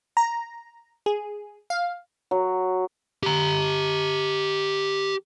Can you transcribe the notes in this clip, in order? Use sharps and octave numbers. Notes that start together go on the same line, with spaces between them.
A#5
G#4
F5
F#3
G4 A#5